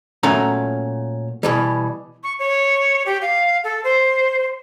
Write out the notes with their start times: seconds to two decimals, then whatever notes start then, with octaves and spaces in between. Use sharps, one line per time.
0.23 A#2 F#3 A3 B3 C#4 A#5
1.43 B2 E3 G3
2.23 C#6
2.39 C#5
3.06 G4
3.21 F5
3.64 A4
3.84 C5